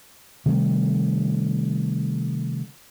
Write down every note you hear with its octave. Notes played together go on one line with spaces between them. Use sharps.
C3 D#3 G3 A3